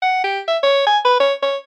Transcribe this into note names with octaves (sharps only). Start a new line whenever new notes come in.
F#5
G4
E5
C#5
G#5
B4
C#5
C#5